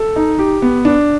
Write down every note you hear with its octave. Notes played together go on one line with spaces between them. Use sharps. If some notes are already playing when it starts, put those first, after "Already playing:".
Already playing: A4
D#4
G4
B3
D4